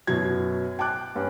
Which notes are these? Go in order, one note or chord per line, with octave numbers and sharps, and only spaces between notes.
F#2 B2 F#3 G#6
G5 A5 D6 F#6
G2 C#4